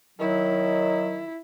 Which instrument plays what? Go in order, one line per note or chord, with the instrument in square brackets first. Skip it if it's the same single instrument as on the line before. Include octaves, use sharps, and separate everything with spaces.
[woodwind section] D#3 F#3 [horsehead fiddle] E4